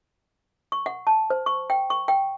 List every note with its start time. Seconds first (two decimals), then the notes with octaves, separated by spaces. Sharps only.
0.72 C#6
0.86 F#5
1.07 A5
1.30 C5
1.46 C#6
1.70 G5
1.90 C#6
2.08 G5